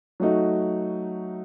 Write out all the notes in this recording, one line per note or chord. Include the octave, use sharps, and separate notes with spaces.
F#3 A3 D#4 F#4